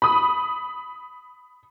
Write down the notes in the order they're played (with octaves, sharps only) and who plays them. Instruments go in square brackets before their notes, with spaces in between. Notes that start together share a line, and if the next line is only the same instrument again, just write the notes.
[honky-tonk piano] B5 D#6